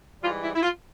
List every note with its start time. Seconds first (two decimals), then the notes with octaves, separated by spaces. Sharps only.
0.23 G#2 E3 G3 F4
0.43 E4
0.55 E4
0.63 F4